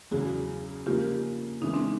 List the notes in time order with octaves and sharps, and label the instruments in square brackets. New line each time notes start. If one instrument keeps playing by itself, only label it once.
[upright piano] E2 C#3 F#3 [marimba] F#4 G#4
[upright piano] C#3 F3 A#3 D4 [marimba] F4 G4
[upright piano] C#3 E3 G#3 B3 [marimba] C#4 D#4
[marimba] C4 D4